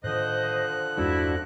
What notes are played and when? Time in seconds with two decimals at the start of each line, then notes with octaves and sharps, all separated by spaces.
0.04 A2 D3 D#3 F3 C5 D#5 F#6
0.97 E2 G2 G#3 D4 E4 F#4